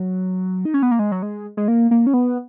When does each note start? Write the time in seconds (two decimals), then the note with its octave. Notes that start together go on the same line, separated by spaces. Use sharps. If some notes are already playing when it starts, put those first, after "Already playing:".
Already playing: F#3
0.65 D#4
0.74 C#4
0.83 B3
0.91 A#3
0.99 G#3
1.12 F#3
1.23 G#3
1.57 G#3
1.68 A#3
1.91 A#3
2.07 C#4
2.14 B3